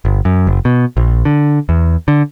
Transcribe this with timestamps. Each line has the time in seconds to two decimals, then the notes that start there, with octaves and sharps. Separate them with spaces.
0.05 G1
0.25 F#2
0.47 F#1
0.65 B2
0.97 A#1
1.25 D3
1.69 E2
2.08 D3